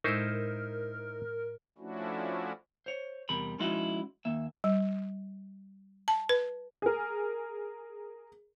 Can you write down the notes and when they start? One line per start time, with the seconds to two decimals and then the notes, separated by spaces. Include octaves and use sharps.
0.04 A2 G#3 D#4 E4 A#4 C5 E6
1.78 F3 A3 C#4 D4 E4 F#4
2.86 C5 C#5
3.29 E2 C3 G3 A#4 B5
3.59 F3 G#3 C#4 D#4 E4 F#4
4.25 D#2 A#3 E5
4.64 G3
6.08 A5
6.29 B4
6.82 G#4 A#4